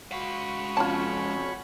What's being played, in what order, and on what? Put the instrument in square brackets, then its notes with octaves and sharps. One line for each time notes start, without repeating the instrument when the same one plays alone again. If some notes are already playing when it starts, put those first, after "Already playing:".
[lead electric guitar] G#3 F5 [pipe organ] F#4 B5 C#6
[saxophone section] F2 C#4 [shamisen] F4 A5